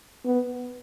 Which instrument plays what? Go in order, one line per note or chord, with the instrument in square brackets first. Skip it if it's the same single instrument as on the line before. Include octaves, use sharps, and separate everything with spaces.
[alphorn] B3